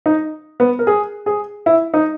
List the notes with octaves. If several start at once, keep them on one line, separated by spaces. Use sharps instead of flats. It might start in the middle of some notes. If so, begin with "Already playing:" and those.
D#4
B3
A#4
G#4
G#4
E4
D#4